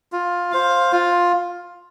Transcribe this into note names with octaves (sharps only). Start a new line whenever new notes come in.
F4
C5 F5
F4